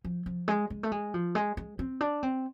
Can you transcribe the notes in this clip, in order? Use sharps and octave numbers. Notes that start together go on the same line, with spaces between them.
F3
F3
G#3
G#3
A3
G#3
F3
G#3
G#3
C4
D4
C4